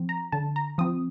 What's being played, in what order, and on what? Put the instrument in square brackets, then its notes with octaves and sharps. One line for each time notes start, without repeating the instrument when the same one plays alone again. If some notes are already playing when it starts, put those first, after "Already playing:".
Already playing: [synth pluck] F3 C4
A#5
D3 A5
A#5
F3 C4 D#6